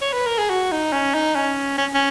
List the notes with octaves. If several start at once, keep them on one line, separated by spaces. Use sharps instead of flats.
C#5
B4
A#4
G#4
F#4
D#4
C#4
D#4
C#4
C#4
C#4